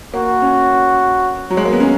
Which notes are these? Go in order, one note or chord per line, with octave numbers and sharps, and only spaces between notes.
A#3 F#4
C#4
F#3
G#3
A#3
B3
C#4